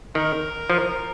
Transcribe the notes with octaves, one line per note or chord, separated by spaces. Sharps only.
D#3 A#4
F3